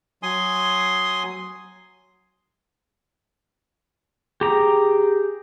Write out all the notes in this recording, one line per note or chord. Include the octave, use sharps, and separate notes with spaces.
F#3 G#5 C6 D#6
G4 G#4 A#5